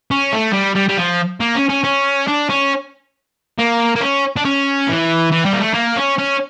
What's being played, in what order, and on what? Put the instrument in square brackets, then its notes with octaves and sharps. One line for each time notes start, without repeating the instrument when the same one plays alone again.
[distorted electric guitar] C#4
A3
G3
G3
G3
F3
A#3
C#4
C#4
C#4
D4
C#4
A#3
A#3
C#4
D4
C#4
E3
E3
G3
A#3
A3
A#3
C#4
C#4